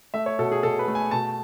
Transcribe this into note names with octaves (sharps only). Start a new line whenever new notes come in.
A3 E5
C#5
B2 A4
G#4
B2 A4
B4
A3
G#5
B2 A5